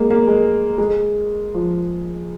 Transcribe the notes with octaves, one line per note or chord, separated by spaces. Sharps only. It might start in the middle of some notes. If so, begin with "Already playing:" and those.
Already playing: G#3 A#3
A#3
G#3
G#3
F3